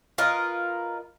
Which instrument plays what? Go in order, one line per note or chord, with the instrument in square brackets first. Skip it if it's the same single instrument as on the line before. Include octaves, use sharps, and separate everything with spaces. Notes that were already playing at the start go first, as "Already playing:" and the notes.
[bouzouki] F4 A#4 B4 D#5